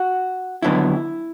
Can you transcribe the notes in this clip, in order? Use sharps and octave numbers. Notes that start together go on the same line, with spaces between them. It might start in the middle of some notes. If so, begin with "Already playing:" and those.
Already playing: F#4
D#2 D3 F#3 B3 E4